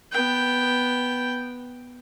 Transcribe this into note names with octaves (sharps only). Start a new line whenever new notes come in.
B3 G5